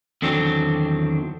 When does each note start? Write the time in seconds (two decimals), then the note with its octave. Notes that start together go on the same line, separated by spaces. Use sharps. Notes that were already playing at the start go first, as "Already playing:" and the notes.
0.22 E2 D3 D#3 F#3 C4 D4